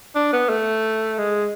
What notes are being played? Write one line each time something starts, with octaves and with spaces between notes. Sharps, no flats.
D4
B3
A3
G#3